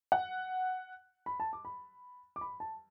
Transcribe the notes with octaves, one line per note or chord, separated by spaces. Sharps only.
F#5
B5
A5
D6
B5
D6
B5
A5